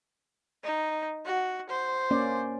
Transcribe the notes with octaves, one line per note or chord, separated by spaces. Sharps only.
D#4
F#4
C5
A#3 C#4 D5